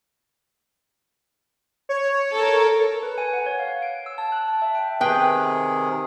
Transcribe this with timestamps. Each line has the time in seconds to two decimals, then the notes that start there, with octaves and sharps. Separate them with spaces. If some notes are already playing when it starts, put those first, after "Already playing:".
1.89 C#5
2.35 A4 A#4
3.03 B4
3.18 G#5
3.33 F#5
3.46 C#5
3.59 F5
3.82 D7
4.06 E6
4.18 A5
4.32 F#6
4.48 A5
4.62 E5
4.75 G5
5.01 C3 D#3 G#4 B4 G5